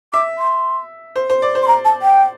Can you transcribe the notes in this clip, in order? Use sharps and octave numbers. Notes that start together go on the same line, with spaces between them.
E5 D6
C6
C5
C5
D5
C5
C6
A#5
A5
G5